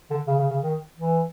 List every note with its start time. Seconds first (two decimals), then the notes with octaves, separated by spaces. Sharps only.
0.10 D3
0.27 C#3
0.39 C#3
0.50 C#3
0.62 D#3
0.97 E3